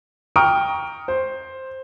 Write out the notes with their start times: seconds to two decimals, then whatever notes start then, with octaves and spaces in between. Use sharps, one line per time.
0.36 G5 A#5 C#6 D#6 F6 D7
1.08 C5